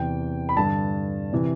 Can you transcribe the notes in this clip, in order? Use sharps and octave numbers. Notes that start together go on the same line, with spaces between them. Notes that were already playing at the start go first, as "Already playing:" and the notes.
Already playing: E2 C3 E3 G5
B5
G2 D3 A5
C3 E3